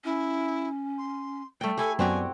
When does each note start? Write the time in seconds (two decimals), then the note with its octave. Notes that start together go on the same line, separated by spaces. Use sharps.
0.04 C#4 E4
0.98 C6
1.61 G3 A3 G5
1.77 E4 G4 A4 G#5
1.99 F#2 F#3 B3 C4 F#4 G4 D5 G#5